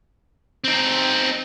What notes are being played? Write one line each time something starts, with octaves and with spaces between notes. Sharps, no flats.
C4 D#4